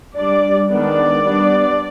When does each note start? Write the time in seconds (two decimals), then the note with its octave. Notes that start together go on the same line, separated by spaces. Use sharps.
0.15 G3 D4 D5
0.69 D#3 G#3 B3 D4 D5
1.22 G3 B3 D4